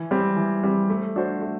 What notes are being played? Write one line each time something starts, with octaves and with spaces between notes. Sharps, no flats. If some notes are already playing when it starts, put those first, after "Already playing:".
Already playing: E3
G3 C4
E3
G3 C4
A3
D4 F#4 C5
A3